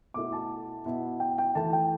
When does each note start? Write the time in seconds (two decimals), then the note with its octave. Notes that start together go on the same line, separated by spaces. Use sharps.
0.14 B2 A3 E4 A4 D6
0.33 A5
0.85 B2 B3 E4
1.20 G5
1.38 G5
1.55 E3 A3 E4 A4 A5
1.73 G5